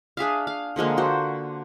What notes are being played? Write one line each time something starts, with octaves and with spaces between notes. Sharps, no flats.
D4 G#4 E5 F5
F5
D3 F3 G#3 A#3
F#4 C5